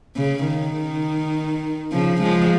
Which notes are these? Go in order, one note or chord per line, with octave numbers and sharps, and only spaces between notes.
C#3
D#3
C#3 F3
F3 G#3